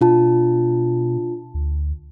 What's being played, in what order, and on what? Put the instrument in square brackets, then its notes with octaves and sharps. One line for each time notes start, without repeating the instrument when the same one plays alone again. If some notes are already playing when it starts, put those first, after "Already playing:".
[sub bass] B2 [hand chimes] D4 F4 A5
[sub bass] D2